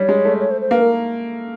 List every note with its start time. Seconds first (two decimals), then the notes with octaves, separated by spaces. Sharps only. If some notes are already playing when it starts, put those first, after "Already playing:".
Already playing: G3 C#5
0.09 G#3
0.25 A3
0.40 C#5
0.51 C5
0.61 C5
0.71 A#3 B4
0.82 A#4